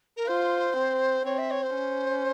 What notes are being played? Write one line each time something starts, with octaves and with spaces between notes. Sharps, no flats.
A#4
F4 C5
C4
C4 C#5
E5
C#5
C5
C#4